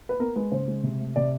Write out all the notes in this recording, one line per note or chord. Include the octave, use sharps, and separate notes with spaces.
B4
B3 A#4
G#3 B4
C#3 C5
G#3
C3
A3
C3 D5